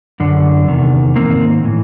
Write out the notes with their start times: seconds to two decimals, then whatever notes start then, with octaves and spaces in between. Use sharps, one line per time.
0.20 F#2 D3
0.68 E2 C3 D#3
1.15 G#2 D#3 A#3 C4
1.63 A2 E3